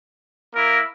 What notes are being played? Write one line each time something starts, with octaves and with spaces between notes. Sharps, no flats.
A#3 E4 A#4